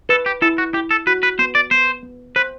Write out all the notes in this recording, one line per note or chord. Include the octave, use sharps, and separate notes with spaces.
A4 B4
G4
E4 A4
F#4
E4 G4
A4
F#4 B4
B4
B3 C5
D5
B3 C5
B3
B4 C5